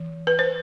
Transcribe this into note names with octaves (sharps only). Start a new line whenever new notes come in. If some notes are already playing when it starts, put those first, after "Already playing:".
Already playing: E3
B4
C5